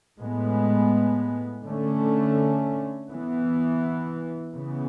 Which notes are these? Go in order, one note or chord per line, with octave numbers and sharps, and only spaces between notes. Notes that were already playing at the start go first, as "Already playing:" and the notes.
A2 G#3 B3
D3 A3 C#4
E3 B3
C#3 E3 B3